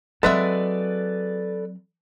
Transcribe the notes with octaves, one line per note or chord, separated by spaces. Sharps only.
F#3 G#3 C4 F#4 A4 B4 D5 E5